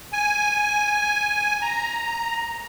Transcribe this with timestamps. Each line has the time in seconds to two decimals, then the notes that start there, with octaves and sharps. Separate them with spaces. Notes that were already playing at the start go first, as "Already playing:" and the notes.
0.13 G#5
1.62 A#5